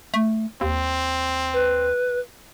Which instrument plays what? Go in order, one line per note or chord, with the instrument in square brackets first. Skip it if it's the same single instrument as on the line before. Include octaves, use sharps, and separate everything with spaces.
[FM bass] A3
[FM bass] D#2 [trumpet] C4
[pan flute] B4